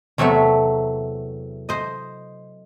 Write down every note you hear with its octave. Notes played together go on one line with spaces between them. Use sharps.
E2 C3 F#3 A3 C#5 E5
C5 D#5